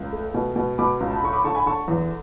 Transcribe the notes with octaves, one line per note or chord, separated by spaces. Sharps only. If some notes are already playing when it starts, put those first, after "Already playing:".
Already playing: C#2
A3
B2
B2
B2 B5 D6
C#2
A5
B5
D3 C#6
B5 D6
D3 A5 C#6
G#5 B5
D3 A5 C#6
E2